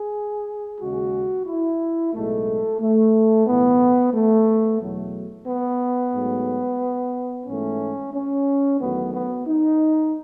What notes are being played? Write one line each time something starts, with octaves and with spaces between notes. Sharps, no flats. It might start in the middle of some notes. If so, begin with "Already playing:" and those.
Already playing: G#4
D#2 C#3 G#3 F#4
E4
B1 A2 G#3 A3
A3
B1 A2 E3 B3
A3
E2 B2 F#3 A3
B3
G#2 F#3 A3
G#2 E3 A3 C#4
C#4
E2 D#3 F#3 A3 B3
B3
D#4